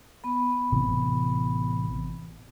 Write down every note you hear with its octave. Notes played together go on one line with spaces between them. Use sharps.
B3 B5
A1 C3 E3